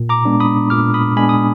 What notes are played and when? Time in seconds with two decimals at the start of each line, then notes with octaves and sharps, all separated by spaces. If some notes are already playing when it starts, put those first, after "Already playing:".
Already playing: A#2
0.09 A#5 D6
0.25 G#3 B3 D4
0.40 B5 D#6
0.70 A#2 D6 F6
0.94 B5 D#6
1.16 G#3 B3 D4 G#5 B5
1.29 D#6